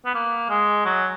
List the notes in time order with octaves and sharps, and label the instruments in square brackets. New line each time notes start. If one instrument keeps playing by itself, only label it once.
[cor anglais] B3
A#3
G#3
F#3